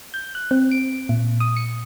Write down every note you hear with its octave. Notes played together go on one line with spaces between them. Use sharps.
G6
F#6
C4
D7
A#2
D#6
C#7